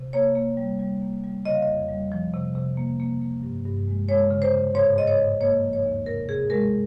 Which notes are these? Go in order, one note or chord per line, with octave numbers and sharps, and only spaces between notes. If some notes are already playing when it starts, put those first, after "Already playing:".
Already playing: C3
A#3 C#5
A#3
G3
G3
A#3
G3
C#3 D#5
F5
F2 D#5
G3
F3
C3
C3
A#3
A#3
A#3
G2
G2
G#3
G#3 C#5
C#3
C5
C#3
G#2 C#5
G#2 D#5
C#5
G#2
A#3 C#5
F3
C#5
D#2
C3 A#4
C3 G#4
G#3 A#4